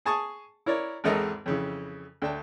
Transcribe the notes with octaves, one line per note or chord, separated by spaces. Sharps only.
G#4 G#5 A5 C#6 D#6
E4 A#4 C#5 D5
G#1 E2 G#2 A4 A#4 D#5
F2 C#3 E3
D2 D4 G5 A5